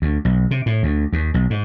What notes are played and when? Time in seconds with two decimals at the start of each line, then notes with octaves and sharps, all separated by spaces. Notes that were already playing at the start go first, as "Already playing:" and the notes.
0.02 D2
0.25 B1
0.51 C3
0.66 A2
0.83 D2
1.13 D#2
1.34 B1
1.50 G#2